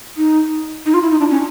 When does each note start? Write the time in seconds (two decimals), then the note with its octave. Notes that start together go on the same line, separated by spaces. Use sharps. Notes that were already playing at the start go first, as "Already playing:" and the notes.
0.17 D#4
0.86 D#4
0.94 F4
1.02 E4
1.11 D#4
1.20 D4
1.30 C#4